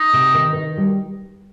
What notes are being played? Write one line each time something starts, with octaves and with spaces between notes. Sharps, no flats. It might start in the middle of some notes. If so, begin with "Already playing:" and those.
Already playing: D#4
C3
D#3
D#3
G3